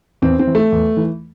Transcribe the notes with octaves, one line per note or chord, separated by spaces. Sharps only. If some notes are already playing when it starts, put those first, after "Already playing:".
E2 C4
C4
E3
A3
E2
E3